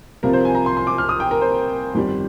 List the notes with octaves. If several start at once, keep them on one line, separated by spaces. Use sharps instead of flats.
C2 C3 F3 C4 F4 A#4
C5
G#5
A#5
C6
C6
D6
F6
D#6
G5
A#4
C5
G1 F2 D#3 G3